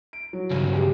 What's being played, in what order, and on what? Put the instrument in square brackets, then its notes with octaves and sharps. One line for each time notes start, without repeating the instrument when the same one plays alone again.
[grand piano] D7
F#3
[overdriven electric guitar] C#2 G2
[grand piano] G4 G#4